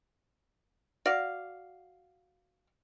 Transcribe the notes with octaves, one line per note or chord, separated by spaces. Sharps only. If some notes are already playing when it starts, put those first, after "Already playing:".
F#4 D5 F5